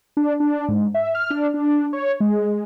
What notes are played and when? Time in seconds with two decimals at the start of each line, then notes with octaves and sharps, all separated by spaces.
0.17 D4
0.40 D4
0.68 G#2
0.94 E5
1.15 F6
1.30 D4
1.54 D4
1.93 C#5
2.20 G#3